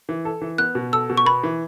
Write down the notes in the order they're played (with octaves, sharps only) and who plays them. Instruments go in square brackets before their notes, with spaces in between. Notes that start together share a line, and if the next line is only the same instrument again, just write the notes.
[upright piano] E3
A4
E3
[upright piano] B3 [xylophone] F#6
[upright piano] B2
[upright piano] A4 [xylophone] E6
[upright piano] B2
[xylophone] C#6
[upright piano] B3 [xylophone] B5
[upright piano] E3